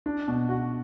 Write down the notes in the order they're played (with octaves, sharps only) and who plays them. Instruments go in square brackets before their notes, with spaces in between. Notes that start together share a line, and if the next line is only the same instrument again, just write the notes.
[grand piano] D4
B2
F#4